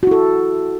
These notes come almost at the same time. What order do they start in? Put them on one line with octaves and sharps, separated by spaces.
F#4 E4 A4